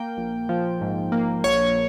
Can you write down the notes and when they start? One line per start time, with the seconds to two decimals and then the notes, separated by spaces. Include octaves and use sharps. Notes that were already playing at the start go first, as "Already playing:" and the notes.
Already playing: A#3 G5
0.17 A#1
0.49 F3
0.81 G#2
1.12 A#3
1.44 A#1 C#5